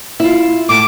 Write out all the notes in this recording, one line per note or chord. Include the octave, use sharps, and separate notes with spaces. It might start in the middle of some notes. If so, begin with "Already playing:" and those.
E4 F4
A2 A3 D6